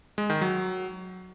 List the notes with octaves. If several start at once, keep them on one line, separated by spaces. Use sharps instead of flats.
G#3
D#3
F#3